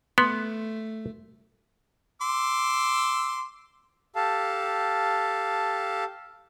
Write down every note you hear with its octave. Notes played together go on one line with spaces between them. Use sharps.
A3 B3 C6
C6 D6 E6
G4 A4 F5 A5